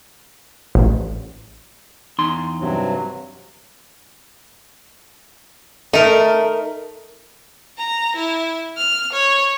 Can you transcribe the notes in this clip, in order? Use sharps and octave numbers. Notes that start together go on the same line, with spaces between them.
A1
E2 D#4 C6
G2 C3 F#3
A3 D#4 A#4
A#5
E4
F6
C#5